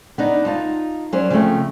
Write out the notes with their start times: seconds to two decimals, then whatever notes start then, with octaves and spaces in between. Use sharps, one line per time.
0.18 B3 D4 D#4
0.45 D#4 F4 A5
1.12 F#3 C#4 C5 D5
1.30 C#3 F3 A3 C4